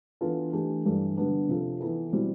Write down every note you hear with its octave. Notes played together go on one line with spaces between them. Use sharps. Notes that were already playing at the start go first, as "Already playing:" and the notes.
E3 B3 D4 F4 A4
E3 A3 D4 G4
G2 E3 G3 D4 A4
D3 G3 B3 D4
C3 F3 C4 F4 A4
E3 B3 E4 A4
B2 G3 C4 E4